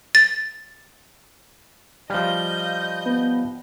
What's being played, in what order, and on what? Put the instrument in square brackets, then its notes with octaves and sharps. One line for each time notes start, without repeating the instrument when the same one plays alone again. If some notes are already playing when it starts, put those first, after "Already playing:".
[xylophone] A6
[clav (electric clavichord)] F3 G3 [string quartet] D#5 G6 [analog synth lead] F5
[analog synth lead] B3